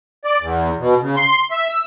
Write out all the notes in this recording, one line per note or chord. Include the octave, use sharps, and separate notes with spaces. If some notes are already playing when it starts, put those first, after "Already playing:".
D5
E2
B2
C#3
C6
E5
E6